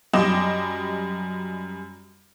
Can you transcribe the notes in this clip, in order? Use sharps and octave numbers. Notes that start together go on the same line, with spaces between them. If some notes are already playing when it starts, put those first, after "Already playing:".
F#2 G3 D#5 G5 D6 E7